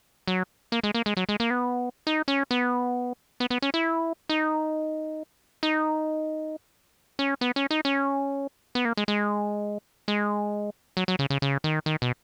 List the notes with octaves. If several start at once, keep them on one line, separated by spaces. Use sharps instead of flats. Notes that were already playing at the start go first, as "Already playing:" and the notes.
F#3
A#3
G#3
A#3
G#3
F#3
G#3
A#3
B3
D#4
C#4
B3
B3
B3
C#4
E4
D#4
D#4
C#4
B3
C#4
D#4
C#4
B3
A#3
G#3
G#3
G#3
F#3
F#3
C#3
C#3
C#3
D#3
D#3
B2